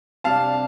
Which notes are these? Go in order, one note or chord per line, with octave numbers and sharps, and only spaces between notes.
C3 G3 D4 F5 A5